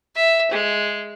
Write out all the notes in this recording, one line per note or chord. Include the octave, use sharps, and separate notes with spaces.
E5
G#3